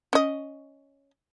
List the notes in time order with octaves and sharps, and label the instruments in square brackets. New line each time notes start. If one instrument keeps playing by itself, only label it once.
[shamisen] C#4 D#5